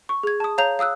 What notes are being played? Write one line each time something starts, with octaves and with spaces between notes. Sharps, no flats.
C#6
G#4 G#6
A5 D#6
C#5 F5 A#5 G6 F7
F5 D#6 E6 F#6